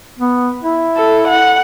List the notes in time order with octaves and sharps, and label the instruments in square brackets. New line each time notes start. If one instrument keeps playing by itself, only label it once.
[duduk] B3
E4
[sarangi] A4
F#5